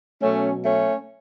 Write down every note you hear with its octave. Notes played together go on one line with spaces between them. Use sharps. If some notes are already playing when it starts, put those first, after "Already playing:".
B2 F#3 A3 C#4
A3 C#4